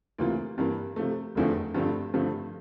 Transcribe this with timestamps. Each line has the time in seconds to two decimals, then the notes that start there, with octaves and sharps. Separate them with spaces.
0.18 D2 C3 E3 A#3 F4
0.58 G2 E3 G3 A#3
0.96 C3 F3 A3
1.35 F1 E2 D3 F3 A3
1.74 G2 D3 F3 A3 C4
2.14 G2 D3 F3 A3